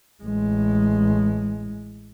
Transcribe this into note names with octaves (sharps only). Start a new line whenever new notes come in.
A1 G#3